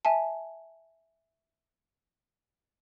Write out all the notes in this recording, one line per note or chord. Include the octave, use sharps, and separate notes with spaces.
E5 G#5 A5